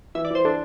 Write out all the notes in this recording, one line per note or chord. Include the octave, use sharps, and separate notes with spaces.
E3 E5
D5
E3 C5
D4 A4